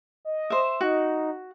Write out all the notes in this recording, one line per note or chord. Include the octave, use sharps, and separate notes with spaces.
D#5
C5 E5
D#4 F#4